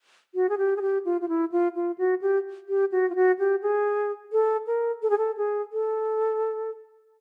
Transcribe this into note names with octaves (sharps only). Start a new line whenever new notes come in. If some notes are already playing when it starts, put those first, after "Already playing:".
F#4
G#4
G4
G#4
G4
F4
F4
E4
F4
F4
F#4
G4
G4
F#4
F4
F#4
G4
G#4
A4
A#4
A4
G#4
A4
G#4
A4